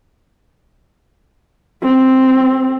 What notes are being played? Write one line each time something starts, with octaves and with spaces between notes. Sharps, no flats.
C4